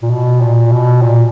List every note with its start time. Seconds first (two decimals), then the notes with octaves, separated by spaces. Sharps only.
0.02 A#2
0.10 B2
0.41 A#2
0.71 B2
1.02 A#2